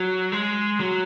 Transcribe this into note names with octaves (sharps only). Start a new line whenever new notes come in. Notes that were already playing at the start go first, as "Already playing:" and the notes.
Already playing: F#3
G#3
F#3